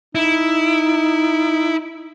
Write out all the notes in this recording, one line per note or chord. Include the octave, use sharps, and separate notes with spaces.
D#4 E4